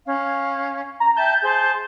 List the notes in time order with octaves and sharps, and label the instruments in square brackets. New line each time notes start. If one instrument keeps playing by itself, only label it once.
[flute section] C#4 F5
[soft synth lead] A#5
[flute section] E5 G5 A5 [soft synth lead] G6
[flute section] G#4 C5 A5